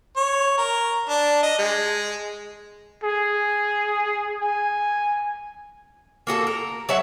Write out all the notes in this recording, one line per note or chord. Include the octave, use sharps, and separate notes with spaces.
C#5
A#4
D4
D#5
G#3
G#4
G#5
A#3 F#4 G#4 A4
A#4
F#3 C#5 E5 F#5